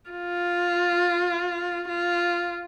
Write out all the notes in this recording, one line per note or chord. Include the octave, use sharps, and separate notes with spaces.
F4
F4